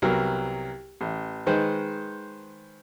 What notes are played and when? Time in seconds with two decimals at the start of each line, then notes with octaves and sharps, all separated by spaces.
0.02 C2 F#3 B3 A#4
1.01 A1
1.46 D#3 G#3 B4 C5